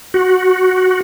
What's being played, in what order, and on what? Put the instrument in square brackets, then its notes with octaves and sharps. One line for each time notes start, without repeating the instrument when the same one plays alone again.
[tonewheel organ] F#4